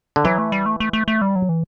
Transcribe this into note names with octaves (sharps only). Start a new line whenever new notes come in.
D3
E3 F#3
A3
G3
A3
A3
A3
A3
G3
F#3
E3